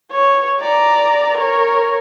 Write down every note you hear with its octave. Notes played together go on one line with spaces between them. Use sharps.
C#5
D5 A#5
A#4 C#5